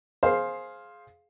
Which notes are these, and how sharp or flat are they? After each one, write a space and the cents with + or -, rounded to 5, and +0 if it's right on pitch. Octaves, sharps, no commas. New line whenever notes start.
G#4 +15 C5 +10 F5 +0